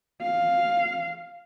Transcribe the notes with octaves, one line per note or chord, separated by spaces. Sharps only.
F5